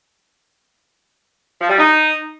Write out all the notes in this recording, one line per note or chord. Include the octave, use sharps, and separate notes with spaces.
F3
G3
D#4